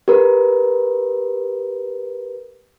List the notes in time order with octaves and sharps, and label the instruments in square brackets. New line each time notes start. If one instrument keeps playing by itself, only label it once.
[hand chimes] G4 A#4 B4